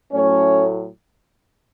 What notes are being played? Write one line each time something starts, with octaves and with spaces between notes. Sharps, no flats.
A2 F#3 A3 C#4 C#5